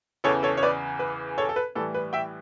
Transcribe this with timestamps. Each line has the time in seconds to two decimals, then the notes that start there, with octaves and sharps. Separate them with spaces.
0.24 E2 C#3 E3 A4 C#5
0.43 A4 C#5
0.57 C#5
0.63 B4 D5
0.99 B4
1.38 A4 C#5
1.49 A4
1.56 B4
1.75 A2 E3 G3 A4
1.94 B4
2.13 E5 G5